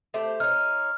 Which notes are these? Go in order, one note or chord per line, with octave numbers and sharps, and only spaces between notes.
A3 G4 C5
D#4 C#5 F6